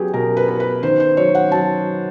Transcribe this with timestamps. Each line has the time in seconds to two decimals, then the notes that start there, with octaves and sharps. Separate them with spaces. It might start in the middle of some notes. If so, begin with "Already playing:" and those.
Already playing: F#3 B3 G4 G#4
0.14 B2 A#4
0.37 B4
0.48 B3
0.60 B4
0.83 D#3 C5
1.00 C5
1.17 F#3 C#5
1.35 F#5
1.51 F#3 A5